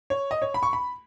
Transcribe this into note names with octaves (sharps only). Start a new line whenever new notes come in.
C#5
D#5
C#5
B5
C#6
B5